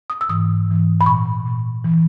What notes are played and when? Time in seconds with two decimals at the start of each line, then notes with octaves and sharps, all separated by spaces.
0.10 D#6
0.21 E6
0.29 G#2 E3 D#6
0.68 G#2 E3
1.01 B5
1.06 A#2 C#6
1.46 A#2
1.84 E3